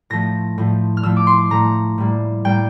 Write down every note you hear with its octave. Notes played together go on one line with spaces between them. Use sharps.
A2 F3 A3 A#6
A2 F3 A3
F6
A2 F3 A3 E6
D6
C6
A2 F3 A3 A#5
A2 G3 A#3
A2 G3 A#3 G5